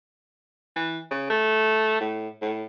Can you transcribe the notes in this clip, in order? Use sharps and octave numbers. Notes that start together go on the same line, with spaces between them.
E3
C#3
A3
A2
A2